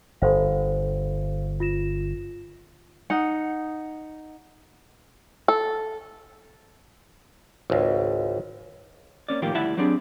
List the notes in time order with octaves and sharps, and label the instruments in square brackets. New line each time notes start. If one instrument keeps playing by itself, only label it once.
[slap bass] G1 [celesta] A4 C5 F5
[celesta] F4 A#6 E7
[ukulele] D#4 F#5
[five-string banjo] A4
[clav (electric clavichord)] G#1 C#2
[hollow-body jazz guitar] A#3 C#4 D5
A2 D#3 F3 A#3 F4 G4
D2 G3 E4 E5 F#5 A5
F#3 G3 C4 D4 G#4